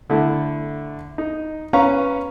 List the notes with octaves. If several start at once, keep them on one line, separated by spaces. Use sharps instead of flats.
D3 A3 E4
D#4
C#4 B4 F5 A#5 C#6